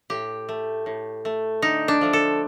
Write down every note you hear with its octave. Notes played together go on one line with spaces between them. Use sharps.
A2 G4
A3
A2
A3
D3 D#4
D4
F3 A3
A4